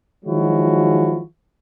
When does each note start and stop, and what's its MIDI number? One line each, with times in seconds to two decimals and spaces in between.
0.24 1.21 51
0.24 1.21 53
0.24 1.21 54
0.24 1.21 56
0.24 1.21 64
0.24 1.21 66